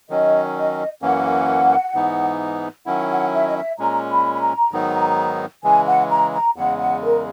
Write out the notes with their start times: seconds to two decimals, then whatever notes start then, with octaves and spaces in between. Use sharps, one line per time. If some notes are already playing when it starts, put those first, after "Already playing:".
0.10 D#3 F#3 C#4 D#5
0.55 D#5
1.02 F#2 E3 A#3 C#4 F#5
1.95 G#2 E3 B3 D#4
2.86 D#3 F#3 C#4 E4 F#5
3.10 F#5
3.33 E5
3.47 D#5
3.56 E5
3.79 A#2 G#3 C#4 A#5
4.10 B5
4.34 B5
4.41 A#5
4.72 G#2 D#3 F#3 B3 D#4
5.64 C#3 E3 G#3 G#5
5.87 F#5
6.10 A#5
6.34 A#5
6.56 E2 C#3 G#3 F#5
6.79 F#5
7.02 A#4